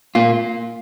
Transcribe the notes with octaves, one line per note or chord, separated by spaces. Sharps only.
A#2 A#3 F4